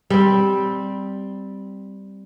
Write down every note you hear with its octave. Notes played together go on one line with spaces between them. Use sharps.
G3 C4